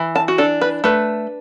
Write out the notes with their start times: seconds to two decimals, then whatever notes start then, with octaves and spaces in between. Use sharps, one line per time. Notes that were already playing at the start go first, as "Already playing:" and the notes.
Already playing: E3
0.16 A5
0.28 F#4
0.38 D4 A4
0.61 B4
0.84 A3 B4